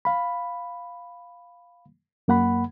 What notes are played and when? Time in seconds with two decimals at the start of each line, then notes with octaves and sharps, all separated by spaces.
0.05 F5 B5
2.28 F#2 A#3 F#5 B5